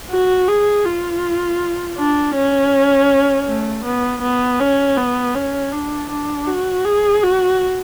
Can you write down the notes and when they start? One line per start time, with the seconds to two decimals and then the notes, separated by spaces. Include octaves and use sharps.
0.10 F#4
0.48 G#4
0.85 F4
1.98 D4
2.35 C#4
3.47 A3
3.85 B3
4.22 B3
4.60 C#4
4.97 B3
5.35 C#4
5.72 D4
6.10 D4
6.47 F#4
6.85 G#4
7.23 F#4